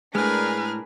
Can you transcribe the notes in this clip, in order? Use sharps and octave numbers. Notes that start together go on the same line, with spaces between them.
A2 G#3 D4 G#4 A#4 B4 F6